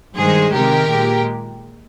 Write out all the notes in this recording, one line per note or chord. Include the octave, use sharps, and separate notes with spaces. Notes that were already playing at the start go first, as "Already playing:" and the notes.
G2 D#3 G#3 G#4 C5
C3 D#3 G#3 G4 A#4
A#2 G#3